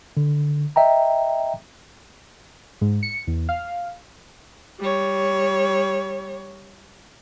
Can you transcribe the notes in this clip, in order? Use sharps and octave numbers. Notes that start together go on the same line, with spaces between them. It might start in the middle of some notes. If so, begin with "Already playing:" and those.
D3
D#5 E5 G5 A#5
G#2
C#7
E2
F5
G3 C#5